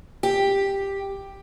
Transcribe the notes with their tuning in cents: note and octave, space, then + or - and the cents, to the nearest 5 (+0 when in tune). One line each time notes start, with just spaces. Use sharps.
G4 +5